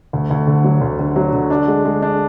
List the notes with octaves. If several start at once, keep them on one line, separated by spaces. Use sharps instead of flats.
D2
D2
D3
F#3
D2
D3
F#3
D3
D4
G#3
G#3
D4